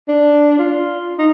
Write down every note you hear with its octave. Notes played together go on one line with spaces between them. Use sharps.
D4
F4
D#4